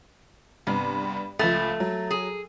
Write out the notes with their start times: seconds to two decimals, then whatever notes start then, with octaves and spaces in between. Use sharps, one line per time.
0.67 G2 C3 B3
1.39 C#2 F3 A3
1.80 F#3
2.11 G#4